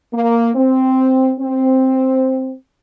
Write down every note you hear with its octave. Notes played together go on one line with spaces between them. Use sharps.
A#3
C4
C4